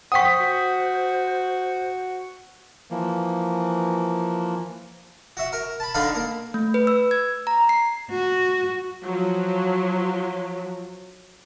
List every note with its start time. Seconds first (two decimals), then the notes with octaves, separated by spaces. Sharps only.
0.12 C5 F#5 G5 C#6 D#6 B6
0.40 F#4
2.91 E3 F3 A#3
5.37 F#4 E5
5.53 A#4
5.80 A5 B5
5.94 D3 D4 D#4 F5 A#5 B5
6.15 A#3
6.54 A3
6.74 B4
6.87 E6
7.11 G#6
7.47 A#5
7.69 C7
8.11 F#4
9.04 F3 F#3